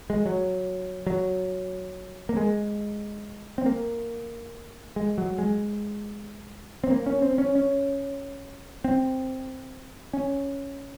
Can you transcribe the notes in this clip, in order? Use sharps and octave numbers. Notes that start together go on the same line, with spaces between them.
G#3
F#3
F#3
A#3
G#3
C4
A#3
G#3
F#3
G#3
C4
A#3
C#4
C4
C#4
C#4
C4
C#4